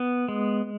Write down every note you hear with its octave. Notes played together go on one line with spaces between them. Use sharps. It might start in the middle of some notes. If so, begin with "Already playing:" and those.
Already playing: B3
G#3